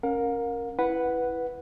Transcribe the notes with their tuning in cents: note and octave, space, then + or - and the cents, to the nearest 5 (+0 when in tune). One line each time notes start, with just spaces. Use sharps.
C#4 -5 A#4 +0 F5 +45
E4 +5 B4 +0 F#5 +0